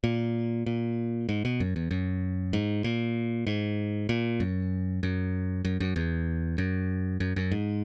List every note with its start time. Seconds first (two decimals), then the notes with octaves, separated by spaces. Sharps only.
0.04 A#2
0.66 A#2
1.29 G#2
1.45 B2
1.60 F#2
1.76 E2
1.91 F#2
2.53 G#2
2.84 A#2
3.47 G#2
4.09 A#2
4.40 F#2
5.03 F#2
5.65 F#2
5.80 F#2
5.96 E2
6.58 F#2
7.20 F#2
7.36 F#2
7.52 G#2